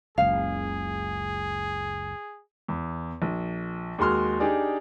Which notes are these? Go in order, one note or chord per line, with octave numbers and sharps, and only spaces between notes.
F#1 C#2 G#4 F5
E2
A#1
D#2 G#3 F#4 C6 F6
D4 D#4 G4 G#4 D5